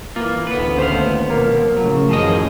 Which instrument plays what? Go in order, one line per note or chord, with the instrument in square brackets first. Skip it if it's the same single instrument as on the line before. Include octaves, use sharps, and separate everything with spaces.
[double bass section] E3 [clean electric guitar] A#3 F4
[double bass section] A1 D2 A3 [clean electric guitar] B3 B4
[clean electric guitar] D#2 B3 F5 [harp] C5
[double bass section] B2 F3 [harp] A#3
[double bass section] A2 C#3 [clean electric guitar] F#3
[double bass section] A1 F#2 D#3 [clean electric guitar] F3 G#4 D#5